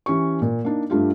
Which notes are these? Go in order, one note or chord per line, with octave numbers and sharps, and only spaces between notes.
E3 C#4 G4 C#6
A#2
A#3 D4 D#4
G2 A3 D4 F4 G4